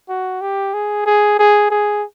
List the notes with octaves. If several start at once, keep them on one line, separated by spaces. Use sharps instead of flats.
F#4
G4
G#4
G#4
G#4
G#4